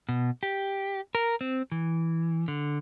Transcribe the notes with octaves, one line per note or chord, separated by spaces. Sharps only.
B2
G4
A#4
C4
E3
D3